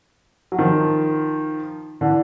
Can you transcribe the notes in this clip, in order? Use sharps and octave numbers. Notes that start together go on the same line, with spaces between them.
F#3
D#3 F3
D3 E3